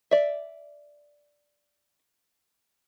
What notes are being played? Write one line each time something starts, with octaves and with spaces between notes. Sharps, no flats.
D5 E5